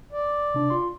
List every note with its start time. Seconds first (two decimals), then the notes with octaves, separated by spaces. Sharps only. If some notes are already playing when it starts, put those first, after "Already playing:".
0.13 D5
0.54 C3 D4
0.70 F4 C6